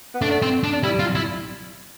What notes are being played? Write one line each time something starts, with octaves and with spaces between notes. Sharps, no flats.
B3
A3 D4
C4
D4
G3 E4
F4
E4